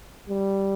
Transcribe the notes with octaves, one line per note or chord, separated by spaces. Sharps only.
G3